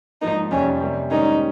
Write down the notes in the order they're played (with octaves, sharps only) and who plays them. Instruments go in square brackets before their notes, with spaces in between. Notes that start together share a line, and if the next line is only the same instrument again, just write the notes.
[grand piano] G#2 F3 A#3 [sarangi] D#4
[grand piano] F2 C3 G3 [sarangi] C#4
[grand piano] C3 G3 A#3
[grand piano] G#2 D#3 G3 A#3 C#4 [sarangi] D#4